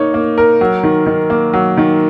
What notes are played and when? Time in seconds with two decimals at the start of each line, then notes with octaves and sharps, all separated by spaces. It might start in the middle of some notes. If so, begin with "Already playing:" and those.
Already playing: A#3 D#4 C#5
0.14 A#3
0.38 A#4
0.61 F#3
0.83 D#3
1.06 D#3
1.30 A#3
1.53 F#3
1.77 D#3